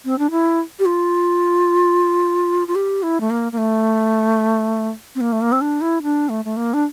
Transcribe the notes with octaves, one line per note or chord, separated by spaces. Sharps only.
C4
D4
E4
G4
F4
F4
G4
E4
A3
A#3
A#3
A3
C4
A#3
A3
A#3
C4
D4
E4
D4
A3
A3
A#3
D4